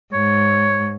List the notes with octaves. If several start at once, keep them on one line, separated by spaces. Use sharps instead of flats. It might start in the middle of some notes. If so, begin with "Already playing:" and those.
G#2 C#5